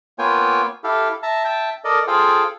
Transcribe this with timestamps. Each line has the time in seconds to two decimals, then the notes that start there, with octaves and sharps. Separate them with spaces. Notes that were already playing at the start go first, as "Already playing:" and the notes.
0.19 A#3 B3 F4 C#5 G5 G#5
0.84 E4 G4 A4 F5
1.23 E5 A5 A#5
1.45 E5 G5 A5
1.85 A4 A#4 D5 D#5
2.07 F4 G#4 A4 C5 F5 G5